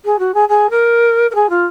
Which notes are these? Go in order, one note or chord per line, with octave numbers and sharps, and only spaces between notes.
G#4
F#4
G#4
G#4
A#4
A#4
G#4
F4